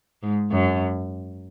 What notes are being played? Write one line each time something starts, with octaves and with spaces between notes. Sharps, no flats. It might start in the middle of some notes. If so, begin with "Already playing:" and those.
G#2
F#2